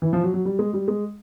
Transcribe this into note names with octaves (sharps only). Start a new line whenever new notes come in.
E3
F3
F#3
F#3
G3
G#3
G3
G#3